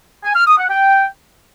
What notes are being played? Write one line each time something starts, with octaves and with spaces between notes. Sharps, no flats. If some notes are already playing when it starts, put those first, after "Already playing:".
G#5
F6
D#6
F#5
G5